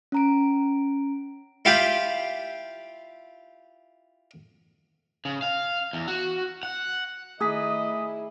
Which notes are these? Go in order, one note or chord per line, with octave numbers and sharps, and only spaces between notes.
C#4 A#5 D7
E4 F4 G4 F5 G5 B5
C#3
F5
E2
F#4
F#5
D#3 A3 E4 G#4 D#5 D#6 B6